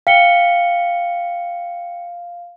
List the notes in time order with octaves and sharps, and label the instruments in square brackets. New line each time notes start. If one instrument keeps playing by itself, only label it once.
[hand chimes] F5 [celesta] G5 C#7 G7